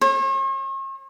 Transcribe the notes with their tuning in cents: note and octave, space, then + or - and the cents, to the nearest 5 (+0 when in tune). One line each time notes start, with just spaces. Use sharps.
C#5 -45